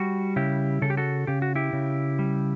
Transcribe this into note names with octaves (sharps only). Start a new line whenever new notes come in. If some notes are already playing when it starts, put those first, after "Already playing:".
Already playing: G3 F#4
C#3 E4 G4
C#3 A4
G4
F#4 A4
C#3 G4
F#4
E4 G4
C#3
G3